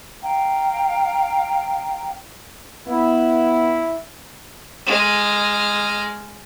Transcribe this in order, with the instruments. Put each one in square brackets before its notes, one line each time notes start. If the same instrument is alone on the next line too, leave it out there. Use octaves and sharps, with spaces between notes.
[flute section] F5 G5 A#5
[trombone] B3 [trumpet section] E4
[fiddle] G#3 F6